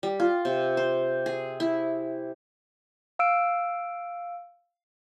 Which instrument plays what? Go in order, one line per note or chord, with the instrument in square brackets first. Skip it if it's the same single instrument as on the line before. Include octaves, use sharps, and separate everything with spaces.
[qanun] G3
F4
C3
C5
G#4
E4
[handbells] F5 E6 D7